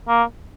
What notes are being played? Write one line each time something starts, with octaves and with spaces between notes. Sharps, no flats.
A#3